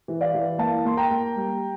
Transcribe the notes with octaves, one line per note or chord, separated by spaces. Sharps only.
E3
D5 F5
E3
A#3 F5 A5
A#3 C6
G5 A#5
A#3
G3